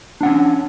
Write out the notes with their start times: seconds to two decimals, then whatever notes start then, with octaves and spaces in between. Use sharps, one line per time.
0.21 D4
0.23 F#5
0.26 C#4